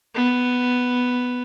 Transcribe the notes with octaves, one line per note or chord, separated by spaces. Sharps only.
B3